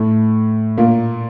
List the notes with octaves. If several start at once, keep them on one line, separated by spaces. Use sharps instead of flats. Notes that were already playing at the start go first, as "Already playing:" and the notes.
Already playing: A2 A3
A#2 A#3